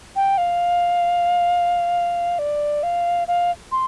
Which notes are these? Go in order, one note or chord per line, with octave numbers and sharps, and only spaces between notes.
G5
F5
D5
F5
F5
C6